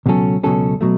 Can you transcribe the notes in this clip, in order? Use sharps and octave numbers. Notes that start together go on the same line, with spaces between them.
C#2 B2 F#3 C#4 A4
C#2 B2 F#3 C#4 A4
B2 F#3 A3